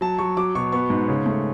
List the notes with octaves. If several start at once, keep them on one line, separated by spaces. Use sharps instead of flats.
F#3 A5
F#3 C#6
F#3 D6
B2 C#6
B3 C#6
G#2
C#3
A3